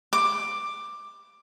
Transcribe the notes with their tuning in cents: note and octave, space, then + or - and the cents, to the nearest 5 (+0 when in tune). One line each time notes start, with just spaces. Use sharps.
D6 +10